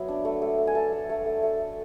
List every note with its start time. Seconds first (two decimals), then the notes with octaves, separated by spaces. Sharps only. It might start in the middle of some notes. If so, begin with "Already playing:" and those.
Already playing: F#3 B3 E5
0.08 D4
0.25 A3
0.42 A3
0.58 A3
0.67 G#5
0.75 A3 A5
0.93 A3
1.09 A3
1.26 A3
1.43 A3
1.60 A3